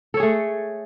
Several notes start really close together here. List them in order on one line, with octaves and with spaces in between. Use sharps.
A4 C#5 G#4 A3